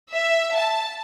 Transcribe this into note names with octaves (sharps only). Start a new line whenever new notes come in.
E5
A5